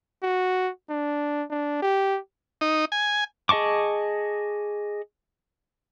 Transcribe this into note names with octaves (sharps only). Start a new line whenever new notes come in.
F#4
D4
D4
G4
D#4
G#5
G#4 D#5 A5 C#6 D6